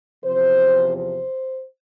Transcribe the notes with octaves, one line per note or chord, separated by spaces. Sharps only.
E2 C3 F3 C4 C5
C5